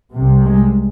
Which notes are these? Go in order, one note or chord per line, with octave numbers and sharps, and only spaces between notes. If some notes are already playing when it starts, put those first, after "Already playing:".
C2 C3
G#3